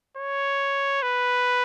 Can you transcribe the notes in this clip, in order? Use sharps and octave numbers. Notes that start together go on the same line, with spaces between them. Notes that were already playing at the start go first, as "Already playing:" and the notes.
C#5
B4